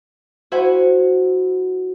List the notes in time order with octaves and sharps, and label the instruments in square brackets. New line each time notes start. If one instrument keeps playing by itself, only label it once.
[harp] E4 F#4 C5 E5 F#5 G#5